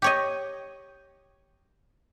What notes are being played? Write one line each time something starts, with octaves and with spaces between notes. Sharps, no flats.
G4 C#5 D#5